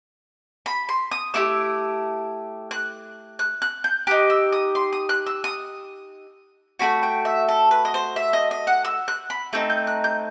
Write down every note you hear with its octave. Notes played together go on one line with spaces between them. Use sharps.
B5
C6
D#6
A3 E4 G4 E6
F#6
F#6
F#6
G6
D#4 G4 F#6
E6
D#6
C6
D#6
F#6
E6
D#6
A3 C4 F#4 B5
G5
E5
A4
B4
D#5
C5
E5
D#5
D#5
F#5
E6
F#6
B5
A3 C4 D#4 G6
G6
F#6
G6